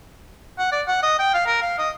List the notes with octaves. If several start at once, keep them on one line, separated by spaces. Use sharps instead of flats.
F#5
D5
F#5
D#5
G5
F5
A#4
F5
D#5